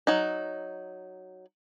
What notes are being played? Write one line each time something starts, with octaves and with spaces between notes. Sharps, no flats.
F#3 D#4